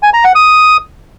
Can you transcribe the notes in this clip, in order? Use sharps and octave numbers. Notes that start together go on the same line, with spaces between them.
G#5
A#5
F#5
D#6